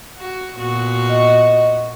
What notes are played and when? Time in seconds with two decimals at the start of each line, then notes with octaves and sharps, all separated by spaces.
0.16 F#4
0.56 A#2 B3 F#4
1.09 D#5